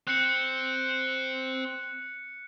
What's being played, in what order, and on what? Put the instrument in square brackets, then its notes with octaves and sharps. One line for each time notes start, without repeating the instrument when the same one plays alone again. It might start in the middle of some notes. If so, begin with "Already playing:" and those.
[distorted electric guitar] C4 [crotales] F#6 C#7